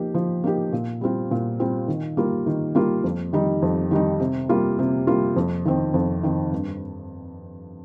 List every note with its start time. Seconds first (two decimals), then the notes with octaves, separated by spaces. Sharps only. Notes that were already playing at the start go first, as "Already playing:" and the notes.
Already playing: F3 A#3 D#4 G4
0.14 F3
0.44 A#3 D#4 G4
0.73 A#2
1.01 G3 C4 F4
1.31 A#2
1.60 G3 C4 F4
1.88 D#3
2.17 G3 A#3 F4
2.46 D#3
2.75 G3 A#3 F4
3.04 F2
3.33 D#3 G3 D#4
3.62 F2
3.91 D#3 G3 D#4
4.20 C3
4.49 G3 A#3 F4
4.79 C3
5.07 G3 A#3 F4
5.36 F2
5.66 D#3 C4
5.94 F2
6.23 D#3 C4
6.52 G2